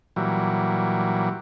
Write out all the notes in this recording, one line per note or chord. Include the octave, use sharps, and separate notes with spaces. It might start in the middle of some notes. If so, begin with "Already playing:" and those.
A#2 E3 F#3 G3